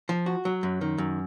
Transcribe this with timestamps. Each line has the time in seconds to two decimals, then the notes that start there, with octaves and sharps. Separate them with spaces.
0.09 F3
0.26 F#4
0.45 F#3
0.63 F#2
0.81 D#3
0.98 F#2